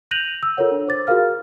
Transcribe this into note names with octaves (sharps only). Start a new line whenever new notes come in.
F#6 G6 A#6 D#7 F7 F#7
E6
F4 A4 A#4 C#5 F#5
D4
C5 D6 A6
F4 F#4 G#4 A#4 F5 F6